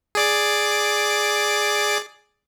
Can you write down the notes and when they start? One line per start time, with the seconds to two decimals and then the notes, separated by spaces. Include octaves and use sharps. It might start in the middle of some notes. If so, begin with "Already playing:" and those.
0.15 G#4 D5 D6